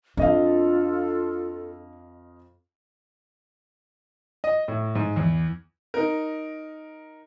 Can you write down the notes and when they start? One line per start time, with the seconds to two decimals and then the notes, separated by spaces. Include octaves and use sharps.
0.17 F2 D4 F4 A4 D#5 F5
4.44 D#5
4.68 A2
4.95 G#2
5.16 E2
5.94 D#4 A#4